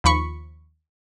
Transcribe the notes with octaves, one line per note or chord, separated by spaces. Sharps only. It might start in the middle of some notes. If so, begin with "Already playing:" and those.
D#2 F3 B5 C#6